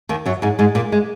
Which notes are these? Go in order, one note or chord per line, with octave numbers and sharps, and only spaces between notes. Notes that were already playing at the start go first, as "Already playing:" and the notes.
D#2 D#3
F#2 F#3
G#2 G#3
G#2 G#3
A#2 A#3
G#3